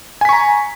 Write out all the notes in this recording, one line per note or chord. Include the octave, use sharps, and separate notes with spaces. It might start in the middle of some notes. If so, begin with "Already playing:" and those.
G#5 A#5 C#6 B6